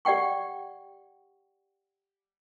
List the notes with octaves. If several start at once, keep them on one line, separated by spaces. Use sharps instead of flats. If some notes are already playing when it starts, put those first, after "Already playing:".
G4 D5 F#5 G5 C#6